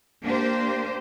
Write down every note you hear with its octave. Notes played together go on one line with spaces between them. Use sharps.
A#3 D4 G4 C5